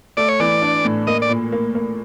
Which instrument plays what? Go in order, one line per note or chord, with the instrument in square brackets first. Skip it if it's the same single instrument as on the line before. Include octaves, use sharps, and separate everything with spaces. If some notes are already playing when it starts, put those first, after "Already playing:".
[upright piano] A3 [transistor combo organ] D5
[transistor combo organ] C#5
[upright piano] E3 [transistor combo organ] D5
[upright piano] D4
A2
[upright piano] A#3 [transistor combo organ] D#5
[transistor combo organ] D5
[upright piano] A#2
A#3
A#3